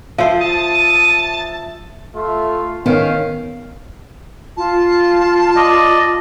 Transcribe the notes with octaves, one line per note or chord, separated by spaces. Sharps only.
F3 C5 E5
A5 D#6
A3 F4
D#3 B3 C#4 F5
F4 A5
D5 D#5